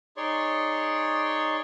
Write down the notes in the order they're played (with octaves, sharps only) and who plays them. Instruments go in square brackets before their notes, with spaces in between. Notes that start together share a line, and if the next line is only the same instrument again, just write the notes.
[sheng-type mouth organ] D#4 G#4 C#5 D5 C6 C#6